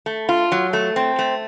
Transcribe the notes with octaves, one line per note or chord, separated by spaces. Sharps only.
A3
F4
F#3
A3
C4
A3